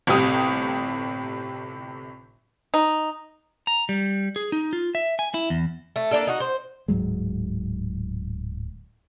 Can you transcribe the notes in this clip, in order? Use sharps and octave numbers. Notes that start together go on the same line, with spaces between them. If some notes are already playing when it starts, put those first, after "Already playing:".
G1 A2 C3 G4 D#6
D#4
A#5
G3
G#4
D#4
F4
E5
G#5
E4
E2
A3
A#3 B3 D4 A4
D#4 F#4
C5
D1 G#2 F#3 G#3